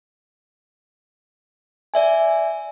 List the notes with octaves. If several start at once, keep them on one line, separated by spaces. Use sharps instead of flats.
D5 E5 G#5